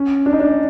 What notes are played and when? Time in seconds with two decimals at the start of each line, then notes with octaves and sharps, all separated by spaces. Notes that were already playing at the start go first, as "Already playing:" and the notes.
Already playing: C#4
0.26 D4
0.33 D#4
0.40 D4